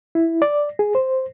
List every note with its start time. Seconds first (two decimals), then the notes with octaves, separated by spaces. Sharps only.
0.15 E4
0.42 D5
0.79 G#4
0.95 C5